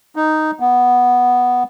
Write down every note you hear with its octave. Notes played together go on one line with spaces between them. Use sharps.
D#4
B3